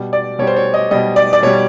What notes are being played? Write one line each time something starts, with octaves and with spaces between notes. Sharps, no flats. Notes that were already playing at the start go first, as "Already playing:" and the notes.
Already playing: B2 G3
D5
B2 G3 C#5
C5
C#5
D#5
B2 G3 D#5
D5
D5
B2 G3 C#5